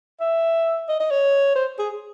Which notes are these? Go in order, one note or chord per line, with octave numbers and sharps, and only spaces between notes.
E5
D#5
D#5
C#5
C5
G#4